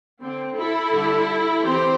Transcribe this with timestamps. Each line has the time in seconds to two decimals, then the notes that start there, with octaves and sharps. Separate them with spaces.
0.21 D3 C4
0.56 E4 A4
0.91 D3 G3 D4
1.62 E3 C4 G4 C5